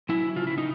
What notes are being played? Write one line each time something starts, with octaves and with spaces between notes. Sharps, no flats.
F#3 E4
C#3 F4
E4
D#4